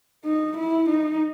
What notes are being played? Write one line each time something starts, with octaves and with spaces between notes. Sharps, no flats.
D#4
E4
D#4